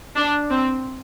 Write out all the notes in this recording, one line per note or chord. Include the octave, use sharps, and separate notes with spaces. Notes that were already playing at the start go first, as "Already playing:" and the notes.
D4
C4